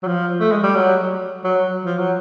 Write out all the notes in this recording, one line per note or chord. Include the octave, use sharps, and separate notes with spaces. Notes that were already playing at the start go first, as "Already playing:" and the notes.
F#3
F3
A3
G#3
G3
F#3
F#3
F3
F#3